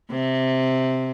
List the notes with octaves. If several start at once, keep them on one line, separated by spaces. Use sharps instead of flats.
C3